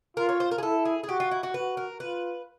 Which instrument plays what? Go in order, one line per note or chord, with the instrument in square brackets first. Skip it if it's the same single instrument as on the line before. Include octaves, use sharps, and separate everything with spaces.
[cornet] F4 [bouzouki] A#4
[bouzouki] C#5
C5
A#4
G#4
[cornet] E4 [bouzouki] A4
[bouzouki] G#4
G#4
[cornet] F#4 [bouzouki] G4
[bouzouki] F4
E4
F#4
[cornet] F#4 [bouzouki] B4
[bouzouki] A#4
[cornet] F4 [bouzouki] B4